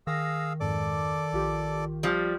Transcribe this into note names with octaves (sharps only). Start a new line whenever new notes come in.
D#3 G#4 F5 E6 A#6
F2 G#2 A4 D5 D6
A#1 F4 G4
F3 G3